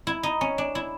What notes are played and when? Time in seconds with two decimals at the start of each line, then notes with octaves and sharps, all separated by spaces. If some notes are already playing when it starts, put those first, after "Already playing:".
0.07 E4
0.23 D#4
0.41 C#4
0.58 D4
0.75 E4